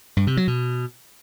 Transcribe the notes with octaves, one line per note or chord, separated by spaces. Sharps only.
G2
C3
F#3
B2